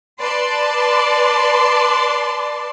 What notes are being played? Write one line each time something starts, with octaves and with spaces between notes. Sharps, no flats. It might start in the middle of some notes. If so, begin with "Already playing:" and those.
B4 D5 A5 C6